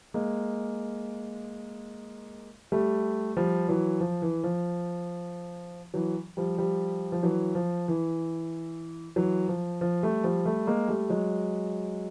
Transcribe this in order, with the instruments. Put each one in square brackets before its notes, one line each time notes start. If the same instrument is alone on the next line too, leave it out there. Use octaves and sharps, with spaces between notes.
[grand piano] G#3 A#3
G3 A3
F3 G3
E3 F#3
F3
E3
F3
E3 F#3
F3 G3
F3 G3
F3
E3 F#3
F3
E3
E3 F#3
F3
F3
G3 A3
F3 G3
G3 A3
G#3 A#3
G3 A3
F#3 G#3